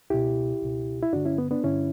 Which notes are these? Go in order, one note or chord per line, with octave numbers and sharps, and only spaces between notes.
C#2 B2 E4 G4
C#2 B2
E4
G2 D3 D4 F#4
C#4 E4
B3
B3 D4
G2 D3 C#4 E4